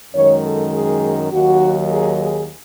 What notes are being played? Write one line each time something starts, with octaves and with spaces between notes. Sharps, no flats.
F#2 D#3 G#3 C#5
A4
G#4
D#2 D#3 F#3 F#4
G#4
G#4